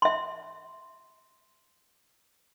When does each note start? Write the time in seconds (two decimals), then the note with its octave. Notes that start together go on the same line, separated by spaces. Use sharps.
0.02 E5 C6